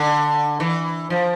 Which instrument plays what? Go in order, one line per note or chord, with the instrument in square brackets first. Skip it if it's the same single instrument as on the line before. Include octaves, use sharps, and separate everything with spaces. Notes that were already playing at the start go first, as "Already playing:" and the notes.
Already playing: [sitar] D3
E3
F3